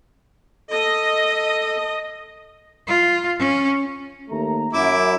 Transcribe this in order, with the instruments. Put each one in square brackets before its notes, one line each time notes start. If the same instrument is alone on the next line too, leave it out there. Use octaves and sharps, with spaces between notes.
[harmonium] A4 [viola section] D#5
[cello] F4
C#4
[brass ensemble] D#2 A3 A#5
[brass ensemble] F#2 [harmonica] E4 E5 D6